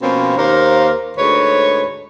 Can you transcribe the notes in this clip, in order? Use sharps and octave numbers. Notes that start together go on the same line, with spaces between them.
B2 F3 A#3 C4 C#4
D#2 A#3 A#4 C5 F5
D2 G#2 B4 C#5